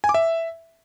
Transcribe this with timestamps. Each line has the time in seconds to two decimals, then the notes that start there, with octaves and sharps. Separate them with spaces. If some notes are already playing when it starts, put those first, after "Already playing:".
0.04 G#5
0.09 D6
0.14 E5